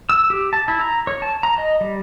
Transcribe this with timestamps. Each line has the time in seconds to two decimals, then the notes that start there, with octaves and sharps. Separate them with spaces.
0.09 E6
0.30 G4
0.53 A5
0.68 E4
0.81 A#5
1.07 C#5
1.22 A5
1.43 A#5
1.58 D#5
1.81 G3